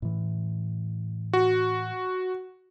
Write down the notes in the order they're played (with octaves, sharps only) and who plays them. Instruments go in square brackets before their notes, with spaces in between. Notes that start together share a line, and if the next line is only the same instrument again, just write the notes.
[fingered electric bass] A2 E3
[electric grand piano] F#4